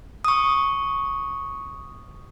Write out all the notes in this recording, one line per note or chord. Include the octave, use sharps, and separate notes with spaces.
C#6 D#6